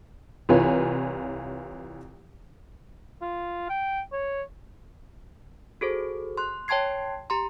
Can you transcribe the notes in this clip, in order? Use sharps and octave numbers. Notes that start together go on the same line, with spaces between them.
C2 E3 F4 B4 C#5 G#5
F4
G5
C#5
F#4 G#4 A4 C5
C6 F#6
C#5 G5 A5 C6 G#6 C7
G4 A#5 C6